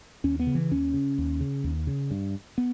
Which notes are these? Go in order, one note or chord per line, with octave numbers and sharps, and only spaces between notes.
D#2 C#4
B3
C#3
E3
D#2 C#4
C#3
D#2
C#3
D#2
C#3
G2
B3